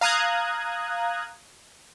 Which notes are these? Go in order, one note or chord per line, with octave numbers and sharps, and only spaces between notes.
F5 A#5 D#6 F#6 G#6